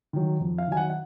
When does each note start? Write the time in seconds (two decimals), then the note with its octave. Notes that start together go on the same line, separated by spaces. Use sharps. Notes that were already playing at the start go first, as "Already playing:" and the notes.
0.13 D#3 F#3
0.40 F2
0.58 F5
0.67 D#3 F#3 G#5
0.77 F#5
0.90 F#5